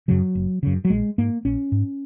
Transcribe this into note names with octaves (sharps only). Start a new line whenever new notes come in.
F#2 C#3 F#3
F#1
F#2 C#3
F#3
A#1 G#3
G#2 A#3
A#1 C#4
G#2